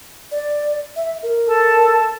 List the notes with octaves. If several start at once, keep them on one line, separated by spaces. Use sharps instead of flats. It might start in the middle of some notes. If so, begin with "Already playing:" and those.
D5
E5
A#4
A4 A5